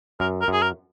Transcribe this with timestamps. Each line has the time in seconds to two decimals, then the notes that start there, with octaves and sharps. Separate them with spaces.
0.20 F#2 A#4
0.41 A#4
0.48 F#2 G#4
0.62 A#4